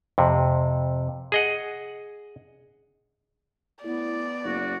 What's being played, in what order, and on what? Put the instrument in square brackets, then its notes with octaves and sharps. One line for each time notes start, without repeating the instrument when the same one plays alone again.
[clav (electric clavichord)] F2 C3
G#4 D#5 F#5
[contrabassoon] A2 [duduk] B3 [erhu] D5
[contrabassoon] F#1 [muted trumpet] F#4